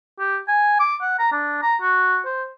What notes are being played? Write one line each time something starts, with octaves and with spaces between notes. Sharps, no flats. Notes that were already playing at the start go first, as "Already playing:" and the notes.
G4
G#5
D6
F#5
A#5
D4
A#5
F#4
C5